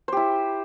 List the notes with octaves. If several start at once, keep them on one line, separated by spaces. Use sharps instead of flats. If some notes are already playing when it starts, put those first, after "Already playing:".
E4 G4 C5